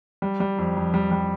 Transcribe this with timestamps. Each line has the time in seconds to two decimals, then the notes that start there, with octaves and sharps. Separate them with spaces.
0.22 G3
0.40 G3
0.58 F2
0.76 F2
0.94 G3
1.11 G3